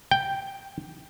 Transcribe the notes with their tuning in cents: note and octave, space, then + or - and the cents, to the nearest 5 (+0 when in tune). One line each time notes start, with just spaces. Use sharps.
G5 +0